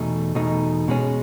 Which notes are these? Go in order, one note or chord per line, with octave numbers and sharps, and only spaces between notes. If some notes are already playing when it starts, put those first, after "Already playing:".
Already playing: E2 B2 A3 D#4
E2 B2 A3 D#4
B2 G#3 C#4